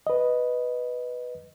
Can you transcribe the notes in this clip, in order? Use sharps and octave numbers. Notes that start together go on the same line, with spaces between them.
B4 D#5